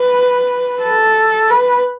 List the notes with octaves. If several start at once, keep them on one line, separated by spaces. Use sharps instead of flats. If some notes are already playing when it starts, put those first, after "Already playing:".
Already playing: B4
A4
B4